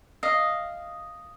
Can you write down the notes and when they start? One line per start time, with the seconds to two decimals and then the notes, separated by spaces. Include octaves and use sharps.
0.23 D#5 F5